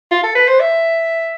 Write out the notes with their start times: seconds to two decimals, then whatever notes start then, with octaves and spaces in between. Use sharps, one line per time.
0.11 F4
0.23 A4
0.35 B4
0.48 C5
0.60 E5